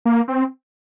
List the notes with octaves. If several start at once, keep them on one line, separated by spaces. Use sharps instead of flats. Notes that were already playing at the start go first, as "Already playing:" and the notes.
A#3
C4